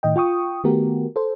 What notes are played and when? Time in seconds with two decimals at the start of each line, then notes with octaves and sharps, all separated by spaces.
0.03 A2 D#3 D#5 G5
0.16 F4 G5 C#6 D#6
0.64 D#3 A3 B3 F#4 G4 A#4
1.16 A4 C5